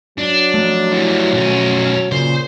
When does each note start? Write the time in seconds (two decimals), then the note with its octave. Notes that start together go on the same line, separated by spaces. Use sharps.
0.18 F#3 D4
0.54 F3 A3
0.93 E3 G3
1.32 B1 C#4
2.12 A#2 C#3 C5